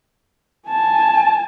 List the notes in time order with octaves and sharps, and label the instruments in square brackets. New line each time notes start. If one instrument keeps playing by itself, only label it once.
[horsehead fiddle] G#5 A5